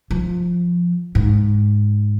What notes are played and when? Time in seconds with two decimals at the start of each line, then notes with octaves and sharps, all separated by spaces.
0.10 F3
1.15 G#2